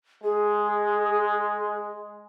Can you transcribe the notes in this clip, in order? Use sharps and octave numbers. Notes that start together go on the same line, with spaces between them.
G#3 G#4